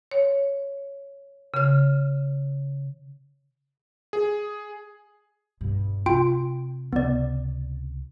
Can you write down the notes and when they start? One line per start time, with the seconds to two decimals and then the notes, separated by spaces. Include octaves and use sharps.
0.11 C#5
1.54 C#3 F6
4.13 G#4
5.61 G2 B2
6.06 C3 F4 G5 D7
6.93 C#2 C3 B3 D5